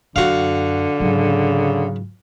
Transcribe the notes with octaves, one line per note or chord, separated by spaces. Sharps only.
F#2 D3 F#4 F5
G#2 C#3 F#3